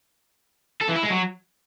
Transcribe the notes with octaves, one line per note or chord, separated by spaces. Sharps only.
A4
E3
E4
G#3
F#3